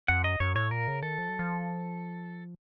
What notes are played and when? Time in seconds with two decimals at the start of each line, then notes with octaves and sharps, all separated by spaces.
0.08 F2 F#5
0.24 F#2 D#5
0.40 F#2 C#5
0.55 A2 C#5
0.71 A#2 A#4
0.87 C#3
1.02 D#3 A4
1.18 F3
1.29 F#3
1.39 F3